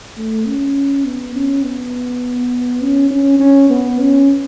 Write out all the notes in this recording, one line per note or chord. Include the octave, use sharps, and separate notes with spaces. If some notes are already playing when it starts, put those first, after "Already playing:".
A3
C#4
B3
C#4
B3
C#4
C#4
C#4
B3
C#4